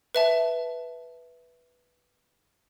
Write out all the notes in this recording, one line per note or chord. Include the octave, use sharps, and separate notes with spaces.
B4 E5 A5